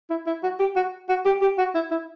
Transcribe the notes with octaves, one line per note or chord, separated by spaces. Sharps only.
E4
E4
F#4
G4
F#4
F#4
G4
G4
F#4
E4
E4